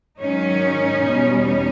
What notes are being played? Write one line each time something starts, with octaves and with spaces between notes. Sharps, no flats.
G#2 D#3 F#3 C#4 D#4
E2 B2 G3
C#4 D#4